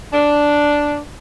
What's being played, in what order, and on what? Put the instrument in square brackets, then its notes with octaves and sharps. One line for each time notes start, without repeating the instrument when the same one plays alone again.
[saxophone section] D4